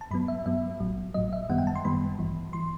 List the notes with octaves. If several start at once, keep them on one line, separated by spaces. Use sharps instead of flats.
A5
G2 F#3 B3 B5
E5
G2 F#3 B3 E5
A1 A2 F#3
A1 A2 F#3 D#5
E5
F#2 D#3 G3 B3 F#5
G5
A5
C6
F#2 D#3 G3 B3 B5
A1 G2 E3
E3 C6